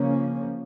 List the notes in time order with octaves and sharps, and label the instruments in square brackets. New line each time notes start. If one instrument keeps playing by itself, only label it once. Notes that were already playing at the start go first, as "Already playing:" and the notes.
Already playing: [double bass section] C#3 F3 A#3 C#4